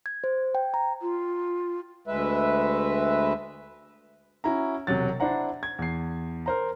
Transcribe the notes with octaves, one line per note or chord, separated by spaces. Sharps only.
G#6
C5
G5
A#5
F4
D2 G#3 B4 E5
C#4 E4 F#4 A#5
E1 C3 F#3 A6
D4 E4 C5 F#5 A#5
G#6
E2 C7
A#4 C5 A#5